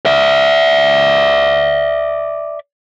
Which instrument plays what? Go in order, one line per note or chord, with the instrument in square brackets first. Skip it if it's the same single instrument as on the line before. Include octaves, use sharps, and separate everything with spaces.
[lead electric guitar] D5 E5